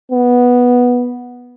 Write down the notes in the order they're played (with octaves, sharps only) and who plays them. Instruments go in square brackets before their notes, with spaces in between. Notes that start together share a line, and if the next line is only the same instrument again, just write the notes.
[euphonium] B3